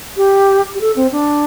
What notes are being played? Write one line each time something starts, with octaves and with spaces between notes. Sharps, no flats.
G4
G4
A4
C4
D4